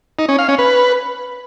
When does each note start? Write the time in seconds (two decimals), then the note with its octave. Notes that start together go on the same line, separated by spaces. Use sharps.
0.19 D#4
0.29 C#4
0.39 F5
0.49 C#4
0.58 B4